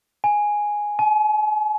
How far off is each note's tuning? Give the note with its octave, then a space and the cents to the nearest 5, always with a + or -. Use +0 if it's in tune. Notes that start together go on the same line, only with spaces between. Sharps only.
G#5 +0
G#5 +45